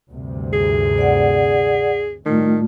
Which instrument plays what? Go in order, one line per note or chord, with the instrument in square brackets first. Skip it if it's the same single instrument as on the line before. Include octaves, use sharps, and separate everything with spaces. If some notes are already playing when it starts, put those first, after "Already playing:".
[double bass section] D2 G2 C3
[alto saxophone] G#4
[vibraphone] D5 F#5
[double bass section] A2 G3 [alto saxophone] D#3 [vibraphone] A3 F4